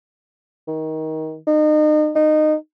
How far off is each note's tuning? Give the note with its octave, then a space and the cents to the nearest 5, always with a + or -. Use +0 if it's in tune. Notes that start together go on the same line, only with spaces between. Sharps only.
D#3 +20
D#4 -35
D#4 -20